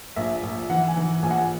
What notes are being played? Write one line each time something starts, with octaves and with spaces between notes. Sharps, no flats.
A#1 E5
A#1
E3 F#5
G#5
E3
A#1 G#5
F#5
G#5